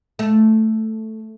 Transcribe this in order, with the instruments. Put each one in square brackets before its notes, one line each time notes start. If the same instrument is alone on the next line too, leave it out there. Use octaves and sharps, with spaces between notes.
[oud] A3